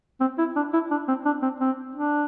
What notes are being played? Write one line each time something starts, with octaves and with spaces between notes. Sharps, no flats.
C4
E4
D4
E4
D4
C4
D4
C4
C4
D4